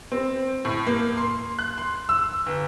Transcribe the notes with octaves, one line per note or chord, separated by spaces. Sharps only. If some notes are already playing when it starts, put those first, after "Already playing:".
C4
A2
A#3
C6
F#6
C6
E6
G1